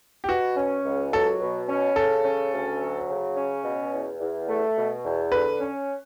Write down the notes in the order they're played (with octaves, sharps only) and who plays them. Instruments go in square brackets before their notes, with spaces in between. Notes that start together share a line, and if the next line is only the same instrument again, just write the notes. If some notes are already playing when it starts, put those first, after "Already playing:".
[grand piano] G4
[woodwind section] B2 [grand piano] F#4
[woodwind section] C#4
C#2
[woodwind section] F#3 [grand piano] A4
[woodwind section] B2
C#4
[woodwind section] C#3 [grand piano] A4
[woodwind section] C#4
D2
F#3
C#3
C#4
B2
E2
E2
A3
B2
E2
[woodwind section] D3 [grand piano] B4
[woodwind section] C#4